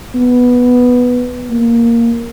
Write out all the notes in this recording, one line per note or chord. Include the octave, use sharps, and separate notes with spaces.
B3
A#3